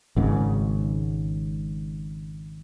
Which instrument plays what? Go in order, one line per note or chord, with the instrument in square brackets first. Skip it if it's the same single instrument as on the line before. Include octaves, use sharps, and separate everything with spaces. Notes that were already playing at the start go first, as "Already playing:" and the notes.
[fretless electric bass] G#1 G#2 C#3